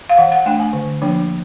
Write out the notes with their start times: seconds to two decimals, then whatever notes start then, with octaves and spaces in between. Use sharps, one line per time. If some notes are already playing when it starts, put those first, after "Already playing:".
0.10 F5
0.17 E3 F#5
0.32 F#5
0.46 A3 D4 G5
0.60 G#5
0.73 D3
1.01 F3 A#3 D4